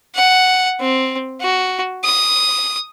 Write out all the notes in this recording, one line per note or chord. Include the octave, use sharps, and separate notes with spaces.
F#5
C4
F#4
D#6